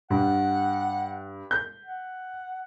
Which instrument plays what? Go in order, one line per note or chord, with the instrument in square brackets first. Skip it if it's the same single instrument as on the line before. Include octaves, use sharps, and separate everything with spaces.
[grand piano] G2 [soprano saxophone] F#5
[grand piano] G6
[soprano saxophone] F#5